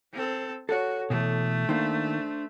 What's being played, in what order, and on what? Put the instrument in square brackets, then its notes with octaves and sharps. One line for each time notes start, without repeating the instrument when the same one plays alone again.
[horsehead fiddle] C4 A4
[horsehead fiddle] F#4 [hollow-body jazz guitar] A4 C#5
[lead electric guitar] B2 E3 [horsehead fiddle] A3
[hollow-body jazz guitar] D#3 A#3 [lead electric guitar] D4 C5